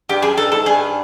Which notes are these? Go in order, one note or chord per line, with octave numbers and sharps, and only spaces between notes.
G2 G4
F#2 G#4
G2 A4
G#2 A4
G2 G#4